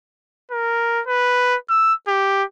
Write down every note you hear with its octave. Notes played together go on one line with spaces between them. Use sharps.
A#4
B4
E6
G4